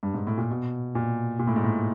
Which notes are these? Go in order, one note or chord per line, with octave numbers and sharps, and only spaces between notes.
G2
G#2
A2
A#2
B2
A#2
A#2
A2
G#2
A2